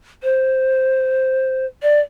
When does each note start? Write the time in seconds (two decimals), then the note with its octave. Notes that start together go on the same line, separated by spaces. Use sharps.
0.23 C5
1.83 D5